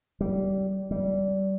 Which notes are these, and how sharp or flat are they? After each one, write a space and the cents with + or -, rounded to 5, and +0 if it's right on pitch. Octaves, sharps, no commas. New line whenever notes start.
G3 -25
G3 -25